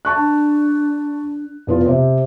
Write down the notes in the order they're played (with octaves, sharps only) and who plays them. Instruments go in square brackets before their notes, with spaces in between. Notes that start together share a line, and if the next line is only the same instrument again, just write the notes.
[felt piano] A5 C#6 F#6
[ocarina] D4
[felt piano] F1 B3 F4
C3 C4